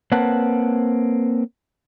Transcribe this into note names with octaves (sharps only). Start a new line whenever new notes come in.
A#3 C4 B4 C#5 F#5 A5